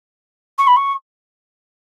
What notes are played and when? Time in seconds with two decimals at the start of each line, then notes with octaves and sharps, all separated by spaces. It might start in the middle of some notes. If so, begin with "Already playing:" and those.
0.58 C#6
0.67 B5
0.76 C#6